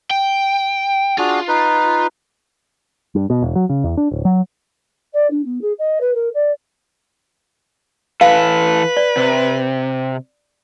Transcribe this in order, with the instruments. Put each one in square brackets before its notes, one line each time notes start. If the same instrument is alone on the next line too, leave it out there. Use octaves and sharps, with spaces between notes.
[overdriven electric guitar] G5
[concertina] D4 F#4 G#4 [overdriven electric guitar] F4
[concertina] D#4 B4
[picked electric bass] G2
B2
E1
F#3
C#3
E2
D4
D1
F#3
[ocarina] D5
D4
B3
G#4
D#5
B4
A#4
D5
[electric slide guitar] E3 A4 [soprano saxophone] B4 [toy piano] F5
[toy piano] D5
[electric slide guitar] C3